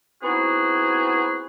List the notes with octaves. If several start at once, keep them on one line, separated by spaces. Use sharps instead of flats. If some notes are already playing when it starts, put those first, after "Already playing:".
B3 C4 D#4 E4 F#4 G#4